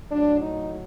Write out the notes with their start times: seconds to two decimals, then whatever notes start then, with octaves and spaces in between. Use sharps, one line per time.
0.11 A2 F#3 D4
0.40 D#4